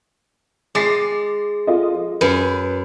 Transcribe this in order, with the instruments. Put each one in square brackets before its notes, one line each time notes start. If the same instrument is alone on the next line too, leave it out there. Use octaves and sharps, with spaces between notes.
[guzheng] G#3 [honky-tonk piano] D6 A6 C7
[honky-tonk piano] F4 A4 D#5
F3
[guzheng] F#2 [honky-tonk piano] B4